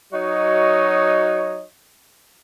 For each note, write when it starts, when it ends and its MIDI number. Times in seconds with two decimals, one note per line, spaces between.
0.13 1.62 54
0.13 1.62 63
0.13 1.62 66
0.13 1.62 73
0.13 1.62 75